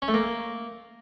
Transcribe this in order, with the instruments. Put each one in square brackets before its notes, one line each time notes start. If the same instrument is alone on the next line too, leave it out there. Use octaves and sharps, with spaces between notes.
[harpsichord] C#4
A3
A#3